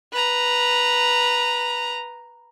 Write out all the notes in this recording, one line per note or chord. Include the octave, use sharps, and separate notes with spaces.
B4 A#5